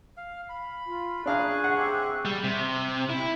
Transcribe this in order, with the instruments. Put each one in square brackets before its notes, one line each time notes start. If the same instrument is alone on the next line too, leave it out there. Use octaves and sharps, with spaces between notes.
[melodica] F5
B5
[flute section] F4
[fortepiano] D4 F5 A#5 [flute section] G#4 C#6 F#6
[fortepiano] F#5 [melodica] A#5
[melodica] C4 G4 E5
[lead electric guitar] G3
C3
E4